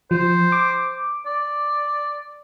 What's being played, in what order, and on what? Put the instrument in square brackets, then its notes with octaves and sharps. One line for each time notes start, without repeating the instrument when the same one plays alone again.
[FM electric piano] F3 [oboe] C5
[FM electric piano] D6
[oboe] D5